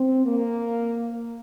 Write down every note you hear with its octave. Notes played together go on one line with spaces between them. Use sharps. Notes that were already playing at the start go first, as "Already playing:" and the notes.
Already playing: C4
A#3